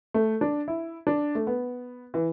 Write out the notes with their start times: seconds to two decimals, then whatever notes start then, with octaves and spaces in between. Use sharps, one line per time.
0.14 A3
0.41 D4
0.68 E4
1.07 D4
1.35 A3
1.47 B3
2.14 E3